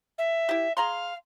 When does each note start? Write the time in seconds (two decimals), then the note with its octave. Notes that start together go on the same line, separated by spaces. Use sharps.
0.18 E5
0.49 E4 G4
0.77 G#4 F5 A#5 C6